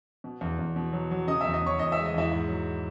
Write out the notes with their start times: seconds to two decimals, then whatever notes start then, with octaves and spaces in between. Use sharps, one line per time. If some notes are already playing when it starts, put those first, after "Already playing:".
0.24 B2
0.41 E2
0.59 E2
0.76 B2
0.93 F#3
1.11 F#3
1.27 C#3 D#5 D#6
1.41 E5 E6
1.45 E2
1.54 D#5 D#6
1.62 E2 C#5 C#6
1.79 E2 D#5 D#6
1.92 E5 E6
1.97 G#3
2.05 D#5 D#6
2.14 E2 E4 E5
2.32 G#2
2.48 F#3